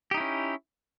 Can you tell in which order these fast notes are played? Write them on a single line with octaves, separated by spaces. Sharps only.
G4 D#4 E4 C#4